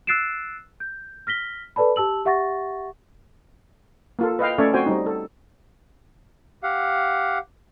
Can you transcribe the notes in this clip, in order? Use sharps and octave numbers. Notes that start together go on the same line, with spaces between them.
E6 F#6 A6 C7 D7 E7
G6
F6 A#6 B6 G7
A4 B4 D5 A5 B5
G4 A5 E6 F#7
G4 E5 F#5 C#6 A6 A#6
A#3 F4 A4
B4 D#5 F5 G5
A3 C#4 A4 C#5 D5 E5
C4 F#4 C5 G5 G#5
G3 D#4
A4
G4 F5 F#5